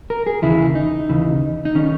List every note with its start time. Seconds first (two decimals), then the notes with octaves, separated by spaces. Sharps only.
0.10 A#4
0.26 G#4
0.42 D#2 C#3 E3 E4
0.75 D#4
1.09 D#2 C#3 E3
1.65 D#4
1.75 D#3 C#4